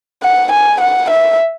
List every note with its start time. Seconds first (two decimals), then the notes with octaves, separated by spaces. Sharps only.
0.23 F#5
0.52 G#5
0.81 F#5
1.11 E5